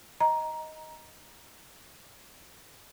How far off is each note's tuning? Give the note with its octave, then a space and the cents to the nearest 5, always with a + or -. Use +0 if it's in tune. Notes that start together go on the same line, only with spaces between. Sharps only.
D#5 +10 A#5 +10